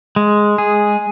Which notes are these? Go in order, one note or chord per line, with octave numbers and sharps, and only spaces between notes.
G#3
G#4